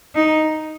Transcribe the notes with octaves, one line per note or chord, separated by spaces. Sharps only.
D#4